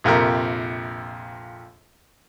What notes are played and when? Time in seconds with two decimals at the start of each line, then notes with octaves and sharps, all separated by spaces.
0.04 A#1 F2 C3 A#4